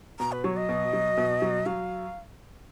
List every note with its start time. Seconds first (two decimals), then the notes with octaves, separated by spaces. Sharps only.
0.19 B2 A#5
0.32 B4
0.44 F#3 C#5
0.57 D#5
0.69 B2
0.93 F#3
1.17 B2
1.42 F#3
1.66 F#3 F5